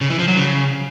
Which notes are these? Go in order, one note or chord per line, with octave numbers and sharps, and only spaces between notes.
C#3
E3
F3
F#3
C#3